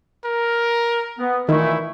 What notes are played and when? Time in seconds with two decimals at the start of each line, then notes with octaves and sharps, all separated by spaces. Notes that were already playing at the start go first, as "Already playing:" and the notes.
0.25 A#4
1.19 B3
1.49 A#2 D#3 E3 A3 E4